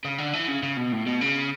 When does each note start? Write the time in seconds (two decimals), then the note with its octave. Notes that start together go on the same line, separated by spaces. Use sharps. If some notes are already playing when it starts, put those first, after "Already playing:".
0.05 C#3
0.18 D3
0.33 E3
0.48 C#3
0.63 C#3
0.77 B2
0.92 A2
1.06 B2
1.21 C#3